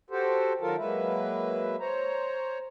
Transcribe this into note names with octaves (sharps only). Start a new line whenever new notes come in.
F#4 G4 A4 C5
D#3 F#3 F4 A4 A#4 A5
F#3 G#3 A#3 B4 E5
C5 C#5 A#5